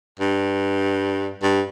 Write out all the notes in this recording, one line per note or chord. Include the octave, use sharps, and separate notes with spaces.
G2
G2